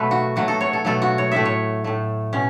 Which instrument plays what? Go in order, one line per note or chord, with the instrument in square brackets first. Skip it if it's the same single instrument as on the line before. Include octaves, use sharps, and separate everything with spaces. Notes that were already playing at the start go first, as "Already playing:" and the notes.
Already playing: [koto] B2 F#3 A3 A4 B4
F#4
B2 F#3 A3 F#4
A4
C#5
A4
B2 F#3 A3 A4
F#4
C#5
A2 A3 E5
C#5
A2 A3
B2 C#4